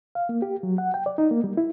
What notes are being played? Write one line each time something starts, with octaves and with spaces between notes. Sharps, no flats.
F5
A#3
G4
F#3
F#5
G5
D5
D#4
A#3
G3
E4